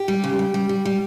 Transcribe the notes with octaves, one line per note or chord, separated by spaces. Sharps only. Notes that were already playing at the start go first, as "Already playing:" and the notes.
Already playing: G4
G3
C#3
G3
G3
G3
G3